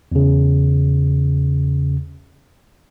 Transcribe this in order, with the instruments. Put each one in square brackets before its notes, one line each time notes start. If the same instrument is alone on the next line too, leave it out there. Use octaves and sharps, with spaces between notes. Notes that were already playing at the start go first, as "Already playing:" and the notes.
[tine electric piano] E2 C#3